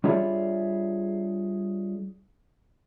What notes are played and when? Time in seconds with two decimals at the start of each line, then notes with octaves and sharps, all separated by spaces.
0.04 G3 D4 F4 G#4 C#5 E5